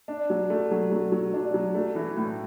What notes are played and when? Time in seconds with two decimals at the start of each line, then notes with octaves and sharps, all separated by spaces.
0.08 D4
0.30 F#3
0.50 A3
0.71 F#3
0.92 F#3
1.12 F#3
1.34 D4
1.54 F#3
1.75 A3
1.95 E3
2.17 A2